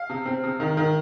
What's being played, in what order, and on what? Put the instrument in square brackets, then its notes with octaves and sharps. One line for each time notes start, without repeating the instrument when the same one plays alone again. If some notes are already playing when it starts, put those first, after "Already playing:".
Already playing: [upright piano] F5
C3
C4
C3
D#3
D#3